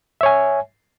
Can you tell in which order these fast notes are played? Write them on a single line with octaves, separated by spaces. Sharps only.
E5 C#5 G#5